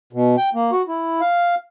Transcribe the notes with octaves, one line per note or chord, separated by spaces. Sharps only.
B2
G5
A#3
F#4
E4
F5